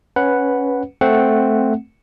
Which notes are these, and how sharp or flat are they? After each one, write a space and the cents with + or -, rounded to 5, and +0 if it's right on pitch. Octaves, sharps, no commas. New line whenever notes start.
C#4 +0 B4 +0 F#5 +0
A3 +0 C4 +0 F#5 +0